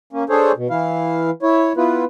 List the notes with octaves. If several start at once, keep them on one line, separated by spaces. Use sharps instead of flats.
A#3 C#4
D4 G#4 A4 C5 C#5
B2
E3 E4 F5
E4 C#5
B3 E4 F4 B4